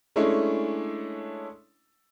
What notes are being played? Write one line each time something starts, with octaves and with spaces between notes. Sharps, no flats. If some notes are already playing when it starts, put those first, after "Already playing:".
G#3 A3 C#4 D4 E4 A4